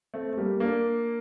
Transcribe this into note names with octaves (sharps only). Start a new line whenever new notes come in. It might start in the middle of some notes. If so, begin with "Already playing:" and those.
A3 C4
A3
G3 A#3
A#3 D4